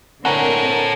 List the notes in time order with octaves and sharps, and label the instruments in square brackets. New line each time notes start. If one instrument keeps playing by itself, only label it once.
[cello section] D3 C4 A#4 [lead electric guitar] A4 C#5 [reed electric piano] F#5 G#5 A#5